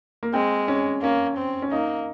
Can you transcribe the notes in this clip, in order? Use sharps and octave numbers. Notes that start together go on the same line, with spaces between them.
A#3
G#3 C4
C#4
A#3 C#4
C4
C#4
A#3 D#4